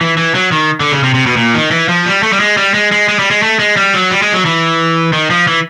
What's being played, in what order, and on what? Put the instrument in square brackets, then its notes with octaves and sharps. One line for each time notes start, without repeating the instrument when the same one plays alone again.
[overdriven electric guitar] E3
E3
F#3
D#3
D3
C#3
C3
C3
B2
A#2
D#3
E3
F3
G3
A3
G3
G#3
G3
G#3
G#3
G#3
G3
G#3
A3
G#3
G3
F#3
G3
G#3
F#3
E3
D#3
F3
E3